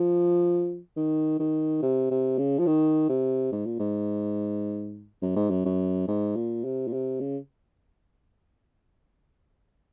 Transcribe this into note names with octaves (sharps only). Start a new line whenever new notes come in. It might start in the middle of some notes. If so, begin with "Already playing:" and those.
Already playing: F3
D#3
D#3
C3
C3
C#3
F3
D#3
C3
G#2
A#2
G#2
F#2
G#2
F#2
F#2
G#2
A#2
C3
A#2
C3
C#3